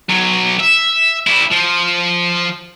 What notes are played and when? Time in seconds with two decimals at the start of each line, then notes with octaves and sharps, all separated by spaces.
0.10 B1 F#3
0.60 E5
1.27 G3 E4
1.52 F3